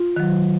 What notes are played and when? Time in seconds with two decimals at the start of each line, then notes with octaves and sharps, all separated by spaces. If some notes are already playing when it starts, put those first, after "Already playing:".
Already playing: F4
0.16 D#3 F#3